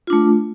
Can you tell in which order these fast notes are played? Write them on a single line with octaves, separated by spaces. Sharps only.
F4 D4 A3